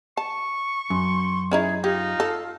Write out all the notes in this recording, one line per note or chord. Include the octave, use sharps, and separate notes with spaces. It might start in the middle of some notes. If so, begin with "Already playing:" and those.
A5 C#6
F#2 C6
C#4 D#4 E4 G#4
D#4 F4 G4
A4